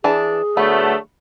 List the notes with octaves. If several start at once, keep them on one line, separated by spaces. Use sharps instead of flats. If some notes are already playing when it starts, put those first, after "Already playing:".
E3 D4 G#4
D3 F#3 A3 B3